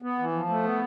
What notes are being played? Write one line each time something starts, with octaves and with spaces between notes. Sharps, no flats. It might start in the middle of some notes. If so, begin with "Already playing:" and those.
B3
E3
F3
A3
B3